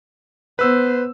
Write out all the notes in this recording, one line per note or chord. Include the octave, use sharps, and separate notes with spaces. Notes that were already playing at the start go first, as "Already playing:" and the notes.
B3 B4 C5 E6